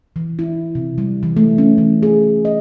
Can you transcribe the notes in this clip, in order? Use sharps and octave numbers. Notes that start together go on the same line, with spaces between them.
E3
E4
C3
G3
E3
A3
C#4
E3
G#4
D#5